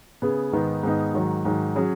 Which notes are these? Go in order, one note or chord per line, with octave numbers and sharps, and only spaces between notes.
C#3 B3 G#4
G#2 D#3 B3 D#4
G#2 D#3 B3 D#4
G#2 D#3 F#3
G#2 D#3 F#3
F#3 C#4 G#4